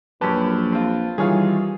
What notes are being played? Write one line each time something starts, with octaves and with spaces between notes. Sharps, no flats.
A#1 F#2 G4 B4 A5
C4 F4
D#3 E3 G3 F4 G#4 C#5 F5